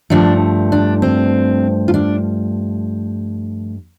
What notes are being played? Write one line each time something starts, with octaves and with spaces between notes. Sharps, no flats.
G2 F3 A3 D4
D4
C4
F4
D4